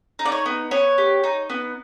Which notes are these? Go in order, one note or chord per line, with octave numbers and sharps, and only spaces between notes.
D#4
D5
C#5
B3
B3 C#5
G4
D#4
B3